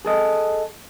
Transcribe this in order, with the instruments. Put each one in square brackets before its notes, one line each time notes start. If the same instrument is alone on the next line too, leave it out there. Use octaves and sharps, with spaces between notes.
[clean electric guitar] G#4 A4 D#5